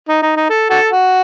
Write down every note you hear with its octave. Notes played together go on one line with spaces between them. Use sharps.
D#4
D#4
D#4
A4
F#4 A4
F#4